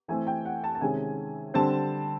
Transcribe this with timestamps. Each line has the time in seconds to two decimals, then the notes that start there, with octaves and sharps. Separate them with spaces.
0.08 E3 A3 C4 G#5
0.27 G5
0.45 F#5
0.64 A5
0.75 A5
0.81 C3 D#3 G#3 C#4 G#5
1.54 D3 G3 C4 A5